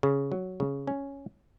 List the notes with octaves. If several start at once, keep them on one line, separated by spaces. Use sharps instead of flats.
C#3
F#3
C#3
C#4